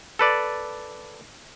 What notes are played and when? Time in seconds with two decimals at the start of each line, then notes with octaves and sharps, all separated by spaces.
0.19 A4 B4 D5